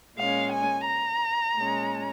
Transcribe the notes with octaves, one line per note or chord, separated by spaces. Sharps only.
A#2 G#3 C#4 F5
G#5
A#5
A#2 G#3 C#4